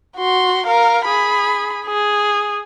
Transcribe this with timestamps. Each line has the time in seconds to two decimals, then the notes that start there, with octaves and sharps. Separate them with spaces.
0.17 F#4 C6
0.66 A#4 F5
1.05 G#4 B5
1.86 G#4